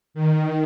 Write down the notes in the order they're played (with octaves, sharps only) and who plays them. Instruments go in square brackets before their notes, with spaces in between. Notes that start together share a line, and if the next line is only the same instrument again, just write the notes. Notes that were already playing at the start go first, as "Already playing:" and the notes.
[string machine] D#3